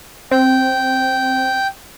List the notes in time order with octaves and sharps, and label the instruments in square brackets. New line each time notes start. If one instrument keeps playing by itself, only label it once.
[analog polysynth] C4 [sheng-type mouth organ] G5